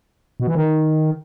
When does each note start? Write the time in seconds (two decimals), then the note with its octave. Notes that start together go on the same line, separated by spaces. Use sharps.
0.40 B2
0.47 E3
0.55 D#3